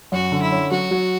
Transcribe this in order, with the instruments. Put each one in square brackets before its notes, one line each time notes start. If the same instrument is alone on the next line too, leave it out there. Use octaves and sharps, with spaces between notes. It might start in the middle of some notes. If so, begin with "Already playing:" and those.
[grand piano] F#2 [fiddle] F#4
[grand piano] D3
[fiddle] E4
[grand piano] C#4
[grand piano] F#3 [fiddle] F#4
[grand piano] F#3